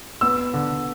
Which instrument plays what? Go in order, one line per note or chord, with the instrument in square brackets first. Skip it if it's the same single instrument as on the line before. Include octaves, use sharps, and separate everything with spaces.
[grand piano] B3 E6
D3